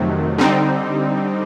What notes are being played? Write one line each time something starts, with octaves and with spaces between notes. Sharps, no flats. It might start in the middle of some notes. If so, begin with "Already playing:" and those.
Already playing: F2 C3 D#3 F#3 A3
D3 G3 C4 D#4